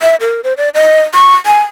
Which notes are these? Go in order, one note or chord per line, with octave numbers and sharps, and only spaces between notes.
E5
A#4
C5
D5
D#5
C#6
G#5